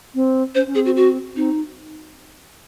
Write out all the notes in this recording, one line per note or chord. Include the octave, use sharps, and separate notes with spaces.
C4
C#4 C5
C#4
C4 G#4
F#4
F#4
C4 D#4